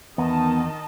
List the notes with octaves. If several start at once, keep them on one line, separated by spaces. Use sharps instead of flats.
E2 D#3 B3 D#5 A5